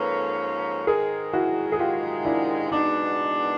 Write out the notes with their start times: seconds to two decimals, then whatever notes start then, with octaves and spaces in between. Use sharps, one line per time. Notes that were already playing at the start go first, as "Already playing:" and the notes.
Already playing: G#2 F3 A#3 C#4 A4 B4
0.87 G#2 D#3 G#3 G#4 A#4
1.33 E4 F#4
1.72 G#4
1.79 F4 G4
2.25 D4 E4
2.71 B2 G#3 B3 D4 D#4